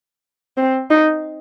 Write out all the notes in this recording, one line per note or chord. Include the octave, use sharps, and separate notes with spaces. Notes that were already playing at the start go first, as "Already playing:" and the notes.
C4
D#4